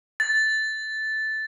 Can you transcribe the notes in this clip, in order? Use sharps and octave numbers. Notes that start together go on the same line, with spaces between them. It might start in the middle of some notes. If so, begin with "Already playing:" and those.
A6